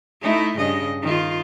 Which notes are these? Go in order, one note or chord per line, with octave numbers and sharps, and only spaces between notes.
A3 D#4 E4
G2 C#3 D#5
D#3 F4